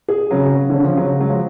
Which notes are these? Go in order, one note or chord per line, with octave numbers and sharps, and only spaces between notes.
G#4
C#3 F#3
C#3
D3 C#4
F3
C#3 F#3
F#3 G#3
F3